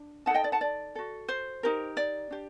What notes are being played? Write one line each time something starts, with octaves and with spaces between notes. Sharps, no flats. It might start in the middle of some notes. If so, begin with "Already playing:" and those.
Already playing: D4
D#4 A4 D#5 F#5 G5 A5
D5
F#5 A5
D5
F#4 A4
C5
D#4 G4 A#4
D5
D4 G4